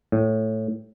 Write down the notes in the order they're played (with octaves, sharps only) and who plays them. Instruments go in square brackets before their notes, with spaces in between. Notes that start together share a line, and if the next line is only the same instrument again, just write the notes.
[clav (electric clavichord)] A2